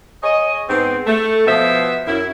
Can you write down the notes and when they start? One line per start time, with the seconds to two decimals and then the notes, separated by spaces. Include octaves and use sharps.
0.23 G#4 C#5 D#5
0.69 G#2 B3 C4
1.07 A3
1.47 B2 F3 B3 C5 E5
2.08 F#2 E4